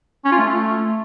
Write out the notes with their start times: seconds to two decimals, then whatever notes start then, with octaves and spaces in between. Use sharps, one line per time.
0.25 C#4
0.31 F4
0.38 A3